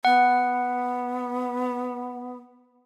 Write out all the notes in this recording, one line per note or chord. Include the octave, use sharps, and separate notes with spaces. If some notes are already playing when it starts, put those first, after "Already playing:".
B3 F#5